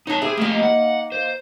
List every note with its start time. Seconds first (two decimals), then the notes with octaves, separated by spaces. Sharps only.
0.07 D#4 A4 C#5 A5
0.22 C4 E4 G4 G#4
0.37 A3 A#3 D#4 G4
0.63 F#5
1.12 C5